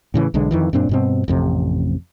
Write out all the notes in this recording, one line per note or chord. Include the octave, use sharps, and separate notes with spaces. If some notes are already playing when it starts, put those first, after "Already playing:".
A2 C#3 E3
B1 D3 G#3
F2 D#3 E3
F#2 A#2 C4 D4
G2 B2 C4
A1 F2 C3